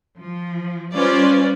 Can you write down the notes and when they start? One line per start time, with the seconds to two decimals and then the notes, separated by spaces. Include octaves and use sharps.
0.20 F3
0.94 G3 C#4 F4 B4 C5 D5